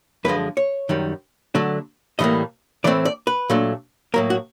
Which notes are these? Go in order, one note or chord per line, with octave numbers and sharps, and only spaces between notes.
F#2 D3 F3 G#3 B4
C#5
F#2 D#3 G3
D3 F#3 A3 D4
A2 E3 G3 A#3 D#5
A2 E3 A3 C4 D5
D5
B4
A#2 F#3 A3 D4
A2 F#3 A#3 A#4
F#4